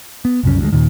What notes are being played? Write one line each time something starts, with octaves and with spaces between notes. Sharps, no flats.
B3
C2 F#2 C#3 C#4
D2 F#3 G#3
D#2 A#2 D#3